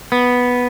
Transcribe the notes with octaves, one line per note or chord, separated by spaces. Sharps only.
B3